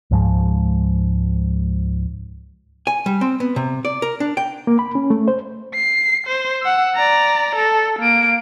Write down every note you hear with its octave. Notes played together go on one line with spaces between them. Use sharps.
C#2 G#2 F3 G#3
G#5
G3
C4
B3
C3
D5
A#4
D4
G5
A#3
B5
C#4
A3
C5
C7
C5
F#5 E6
D5 A#5
A4
A#3 D7